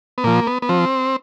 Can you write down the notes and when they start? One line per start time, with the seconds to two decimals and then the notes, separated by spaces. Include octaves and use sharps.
0.18 B3
0.24 A#2 F3 A#3
0.47 B3
0.62 B3
0.69 F3 C4